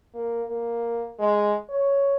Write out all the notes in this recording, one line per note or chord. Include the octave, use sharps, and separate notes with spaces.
A#3
A#3
G#3
C#5